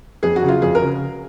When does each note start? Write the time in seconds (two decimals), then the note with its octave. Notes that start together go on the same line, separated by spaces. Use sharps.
0.23 F2 G#4
0.36 F#4
0.43 C#3 F#3
0.48 F4
0.62 F2 G#4
0.75 A#4
0.81 C#3